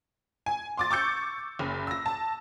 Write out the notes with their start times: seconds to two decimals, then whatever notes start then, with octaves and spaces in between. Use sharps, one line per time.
0.46 G#5
0.77 C6 D6 A6
0.91 C#6 D6 E6 G6 C#7
1.59 F#1
1.87 E6 A#6
2.06 A5